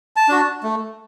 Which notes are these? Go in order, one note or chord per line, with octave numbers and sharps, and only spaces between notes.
A5
D4 F#4
A3